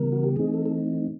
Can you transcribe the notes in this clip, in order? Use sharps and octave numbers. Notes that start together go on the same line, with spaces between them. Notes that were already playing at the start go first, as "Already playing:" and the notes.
Already playing: C#3 E3 G3 B3 A#4
F#4
G4
E3 A3 C4 D#4 G#4
A4
A4